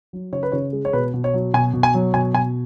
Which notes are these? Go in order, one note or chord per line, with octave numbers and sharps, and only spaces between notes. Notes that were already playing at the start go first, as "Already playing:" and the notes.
F#3
C#3 C#5
B4
C#3 C#5
G#3
C#5
B2 B4
B2
C#5
F#3
B2 G#5
B2
G#5
F#3
B2 G#5
B2 G#5